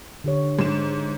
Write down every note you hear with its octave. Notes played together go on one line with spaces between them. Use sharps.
D3 G4 C#5
G#2 E7